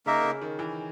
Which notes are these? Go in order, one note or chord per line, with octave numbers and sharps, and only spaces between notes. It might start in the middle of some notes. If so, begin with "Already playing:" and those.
C#3 A#3 D#4 A#4 E5
C#3
D#3
E3